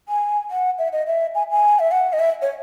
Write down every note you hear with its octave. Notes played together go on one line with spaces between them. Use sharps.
G#5
F#5
E5
D#5
E5
G#5
G#5
E5
F#5
D#5
E5
C#5